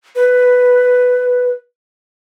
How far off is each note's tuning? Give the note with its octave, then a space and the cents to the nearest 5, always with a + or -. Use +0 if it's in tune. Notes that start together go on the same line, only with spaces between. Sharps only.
B4 +5